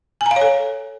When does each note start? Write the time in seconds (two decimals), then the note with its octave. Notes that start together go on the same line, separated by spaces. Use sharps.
0.21 G#5
0.26 A#5
0.31 F5
0.36 C#5
0.41 A4